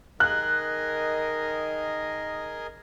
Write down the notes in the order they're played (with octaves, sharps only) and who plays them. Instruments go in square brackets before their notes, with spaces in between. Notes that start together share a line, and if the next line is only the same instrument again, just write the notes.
[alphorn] D#3 [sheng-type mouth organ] G#4 A#4 D#5 [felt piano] F#6